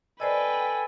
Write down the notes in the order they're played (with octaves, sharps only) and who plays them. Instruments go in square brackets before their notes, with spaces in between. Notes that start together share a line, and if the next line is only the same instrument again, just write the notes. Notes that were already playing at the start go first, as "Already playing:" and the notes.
[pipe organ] A4 G#5 [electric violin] B4 G5 [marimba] C5 D5 D#5